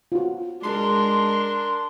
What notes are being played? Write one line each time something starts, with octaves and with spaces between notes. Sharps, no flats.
F4 F#4
G#3 D4 A#4 C6